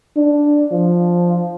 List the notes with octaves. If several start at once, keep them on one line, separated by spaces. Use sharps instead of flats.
D4
F3